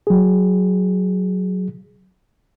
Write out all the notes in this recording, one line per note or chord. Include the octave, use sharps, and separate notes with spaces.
F#3 G#4